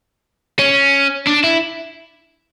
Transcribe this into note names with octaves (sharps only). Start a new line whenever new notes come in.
C#4
D4
E4